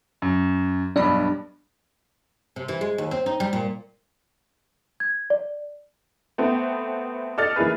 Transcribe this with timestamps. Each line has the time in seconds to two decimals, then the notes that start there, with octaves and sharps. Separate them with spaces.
0.22 F#2
0.96 B1 G2 D4 B5
2.56 C3
2.68 E3
2.81 G#3
2.98 D#2
3.11 C4
3.26 D#4
3.40 G3
3.53 A#2
5.00 G#6
5.30 D5
6.38 A3 B3 C4
7.38 A4 D5 D#5 F6 A6
7.56 E3 A#3 E4 G#4 B4